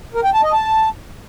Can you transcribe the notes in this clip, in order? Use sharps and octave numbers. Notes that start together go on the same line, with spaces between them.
A#4
G5
A5
D#5
A5